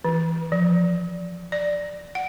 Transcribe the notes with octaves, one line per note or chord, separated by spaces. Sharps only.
E3
F3
D5
F#5